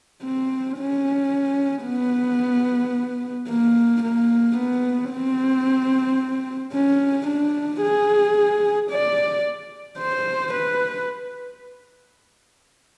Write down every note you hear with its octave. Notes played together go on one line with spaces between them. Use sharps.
C4
C#4
B3
A#3
A#3
B3
C4
C#4
D4
G#4
D5
C5
B4